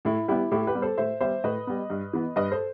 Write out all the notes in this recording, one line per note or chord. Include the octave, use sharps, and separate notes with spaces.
A2 E4
G3 B3 E4 G4
A2 E4 G4
G4 B4
G3 B3
A4 C5
A2 C5 E5
G3 B3 C5 E5
A2 B4 D#5
G3 B3
G2
E3 B3
G2 B4 D#5
A4 C5